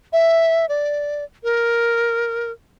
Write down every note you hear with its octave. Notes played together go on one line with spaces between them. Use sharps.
E5
D5
A#4